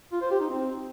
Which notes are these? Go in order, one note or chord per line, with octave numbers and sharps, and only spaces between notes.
F4
C5
G4
D#4
C4